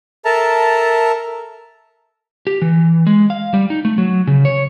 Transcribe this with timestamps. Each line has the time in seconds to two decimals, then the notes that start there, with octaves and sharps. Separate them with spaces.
0.25 A4 A#4 E5 A5 A#5
2.47 G4
2.62 E3
3.07 G#3
3.30 F5
3.54 G3
3.70 D#4
3.85 A3
3.98 F#3
4.27 C#3
4.45 C#5